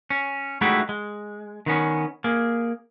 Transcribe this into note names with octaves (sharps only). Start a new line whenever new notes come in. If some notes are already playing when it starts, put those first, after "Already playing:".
C#4
G#3 A3 D#4 E4 F#4 G4
G#3
D#3 B3 C#4
A#3 G#4